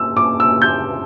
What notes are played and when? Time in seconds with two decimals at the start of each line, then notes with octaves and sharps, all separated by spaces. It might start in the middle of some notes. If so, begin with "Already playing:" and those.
Already playing: E6
0.17 D6
0.40 E6
0.62 G6